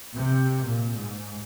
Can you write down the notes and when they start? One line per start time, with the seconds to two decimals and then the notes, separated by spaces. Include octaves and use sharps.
0.14 C3
0.64 A#2
0.96 G#2